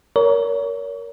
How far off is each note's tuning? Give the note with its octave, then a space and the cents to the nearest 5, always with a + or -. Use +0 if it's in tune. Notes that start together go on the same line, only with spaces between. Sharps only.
A#4 +5 C#5 +30